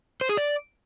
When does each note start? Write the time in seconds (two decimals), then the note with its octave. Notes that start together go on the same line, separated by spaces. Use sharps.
0.21 C5
0.29 G#4
0.37 D5